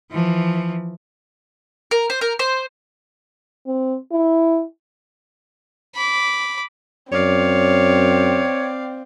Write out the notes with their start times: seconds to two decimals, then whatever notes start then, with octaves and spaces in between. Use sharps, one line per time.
0.11 E3 F3
1.91 A#4
2.10 C5
2.21 A#4
2.39 C5
3.67 C4
4.12 E4
5.95 B5 D6
7.12 F#2 C4 C#5 D5 F5